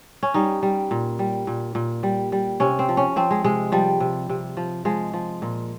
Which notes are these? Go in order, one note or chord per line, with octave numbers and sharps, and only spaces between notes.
C#4
G3 D#4
G3
A#2
G3
A#2
A#2
G3
G3
C3 C#4
C4
F3
C#4
F3 C4
G#3
C3 G#3
F3 G3
C3
C3
F3
F3 G#3
F3
A#2